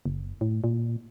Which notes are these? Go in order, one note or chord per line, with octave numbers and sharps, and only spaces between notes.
F#1
A2
A#2